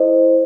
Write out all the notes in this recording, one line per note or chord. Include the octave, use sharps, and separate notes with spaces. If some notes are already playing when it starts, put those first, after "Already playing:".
Already playing: E4 A4 C5 D#5